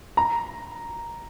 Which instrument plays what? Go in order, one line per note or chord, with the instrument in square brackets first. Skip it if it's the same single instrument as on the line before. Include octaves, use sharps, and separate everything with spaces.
[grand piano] A#5